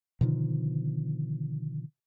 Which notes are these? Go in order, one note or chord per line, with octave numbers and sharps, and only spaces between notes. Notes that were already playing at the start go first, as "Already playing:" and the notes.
B2 D3 D#3 F3